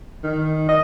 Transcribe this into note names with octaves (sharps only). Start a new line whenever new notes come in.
D#3
D#5